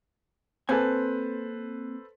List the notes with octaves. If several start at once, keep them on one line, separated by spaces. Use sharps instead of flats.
A#3 C4 A4 B4 C5 G#5